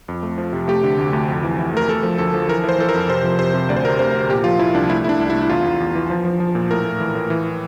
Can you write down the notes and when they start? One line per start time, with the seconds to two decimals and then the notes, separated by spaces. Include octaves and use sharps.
0.08 F2
0.23 A3
0.38 F3
0.53 C3
0.68 A3 G4
0.84 D3
0.98 D2
1.13 D2
1.29 F2
1.43 E3
1.59 E3
1.74 A3 A#4
1.89 A3 A4
2.03 F3
2.18 D2 A4
2.34 F3
2.48 E3 A#4
2.64 E3 C5
2.78 E3 A4
2.89 A#4
2.94 F2
3.09 C3 C5
3.24 F3
3.39 C3 C5
3.54 C3
3.69 D2 D5
3.76 C5
3.85 C3 A#4
3.99 D2 C5
4.15 C3
4.30 A#2 G4
4.44 F3 F4
4.59 F3 E4
4.74 C2 D4
4.90 A3 E4
5.04 A3 D4 E4
5.20 C2
5.30 E4
5.35 A3
5.42 E4
5.49 E2 F4
5.64 E2
5.80 E2
5.95 E3
6.10 F3
6.25 F3
6.40 F3
6.55 A#2
6.71 A2 A#4
6.85 A3
7.00 E3
7.15 A2
7.30 E3